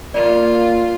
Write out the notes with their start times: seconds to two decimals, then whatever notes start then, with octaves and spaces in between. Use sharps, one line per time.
0.14 A#3 F4 D5